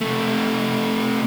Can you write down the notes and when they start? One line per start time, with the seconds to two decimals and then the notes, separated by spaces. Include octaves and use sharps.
0.01 C3 A3